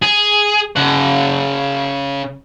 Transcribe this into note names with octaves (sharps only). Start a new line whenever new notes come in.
G#4
C#3 F#5